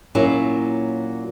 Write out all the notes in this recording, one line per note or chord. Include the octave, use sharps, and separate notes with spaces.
A#2 F#3 A#3 C#4 E4